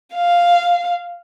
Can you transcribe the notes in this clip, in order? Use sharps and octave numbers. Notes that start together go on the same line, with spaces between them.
F5